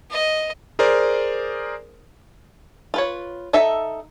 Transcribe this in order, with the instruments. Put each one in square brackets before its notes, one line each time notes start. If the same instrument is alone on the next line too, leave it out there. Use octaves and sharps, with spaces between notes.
[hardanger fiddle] D#5
[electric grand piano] G#4 A#4 C5 D5
[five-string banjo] F4 B4 C#5
D#4 A4 E5